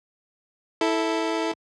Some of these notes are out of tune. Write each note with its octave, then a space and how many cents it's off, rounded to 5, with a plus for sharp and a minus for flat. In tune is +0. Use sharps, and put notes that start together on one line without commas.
E4 -10 A4 +0